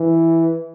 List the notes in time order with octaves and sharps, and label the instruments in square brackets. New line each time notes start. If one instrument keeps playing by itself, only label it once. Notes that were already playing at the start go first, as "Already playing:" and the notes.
Already playing: [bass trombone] E3